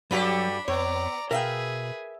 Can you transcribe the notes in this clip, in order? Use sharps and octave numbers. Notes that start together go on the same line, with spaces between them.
G2 F#3 D4 F#4 G4 A4 B4 B5
F2 B3 C#5 D5 A#5
B2 G#4 A#4 B4 E5 F5 G5